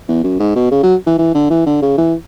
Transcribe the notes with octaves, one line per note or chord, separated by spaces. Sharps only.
E2
F#2
G#2
B2
C#3
F#3
E3
E3
D3
E3
D3
C#3
E3